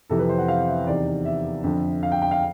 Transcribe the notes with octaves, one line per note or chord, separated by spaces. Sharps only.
F2 C3 E3 A4
B4
C5
F#5
F5
E5
E2 C3 D#3 D5
E5
F2 D3
F5
G5
G5
F5